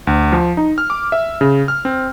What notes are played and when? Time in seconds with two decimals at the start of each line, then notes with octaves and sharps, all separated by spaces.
0.07 D2
0.32 F3
0.57 D#4
0.78 F6
0.90 D6
1.12 E5
1.41 C#3
1.68 F6
1.85 C4